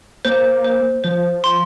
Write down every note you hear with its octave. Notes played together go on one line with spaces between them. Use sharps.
A#3 C5
C5
F3 C5
C6